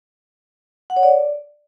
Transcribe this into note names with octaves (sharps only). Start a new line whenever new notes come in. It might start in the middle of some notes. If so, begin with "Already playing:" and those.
F#5
C#5
D5